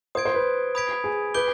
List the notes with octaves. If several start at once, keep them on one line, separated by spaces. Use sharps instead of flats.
C5 D#6 G#6 D7
C5
B4
B5 D#6 G#6 B6 D7
G#4
B4 D6 G6 D7 G7